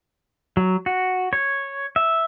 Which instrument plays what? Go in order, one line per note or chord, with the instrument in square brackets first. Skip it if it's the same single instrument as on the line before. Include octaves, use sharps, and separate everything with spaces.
[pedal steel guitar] F#3
F#4
C#5
E5